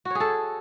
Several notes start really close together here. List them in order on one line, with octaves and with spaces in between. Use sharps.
F#4 C#5 G#4 A4